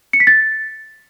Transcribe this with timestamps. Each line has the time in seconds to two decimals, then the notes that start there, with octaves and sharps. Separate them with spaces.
0.13 C#7
0.20 B6
0.27 A6